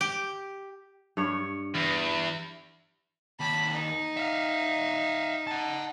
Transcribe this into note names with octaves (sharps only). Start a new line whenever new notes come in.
G4
G2 C#5
E2
D#2 A5 B5
D#4
E5 F5
F#5 A5